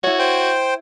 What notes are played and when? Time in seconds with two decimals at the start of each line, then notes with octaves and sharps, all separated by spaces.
0.03 E4 F#4 C#5
0.19 C5 G5